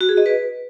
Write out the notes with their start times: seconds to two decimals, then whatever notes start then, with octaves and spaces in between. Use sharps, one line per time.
0.01 F#4
0.09 G#4
0.17 D#5
0.26 B4